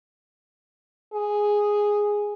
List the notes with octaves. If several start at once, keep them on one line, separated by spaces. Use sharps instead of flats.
G#4